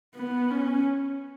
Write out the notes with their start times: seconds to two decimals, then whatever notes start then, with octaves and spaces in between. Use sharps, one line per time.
0.15 B3
0.50 C#4